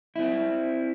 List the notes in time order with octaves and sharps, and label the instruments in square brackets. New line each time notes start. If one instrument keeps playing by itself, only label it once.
[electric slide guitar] C4 E4